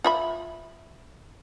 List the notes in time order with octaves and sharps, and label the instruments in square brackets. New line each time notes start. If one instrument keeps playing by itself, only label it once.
[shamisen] F4 E5 B5